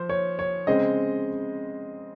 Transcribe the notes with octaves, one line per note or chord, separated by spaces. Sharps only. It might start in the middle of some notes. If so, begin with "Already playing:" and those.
Already playing: F3 C5
C#5
C#5
C#3 G#3 C4 D#5